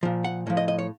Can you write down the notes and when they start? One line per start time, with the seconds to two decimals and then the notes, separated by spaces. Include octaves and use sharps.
0.03 A#2 F3
0.24 F#5
0.47 A2 F3
0.57 D#5
0.68 D#5
0.79 C#5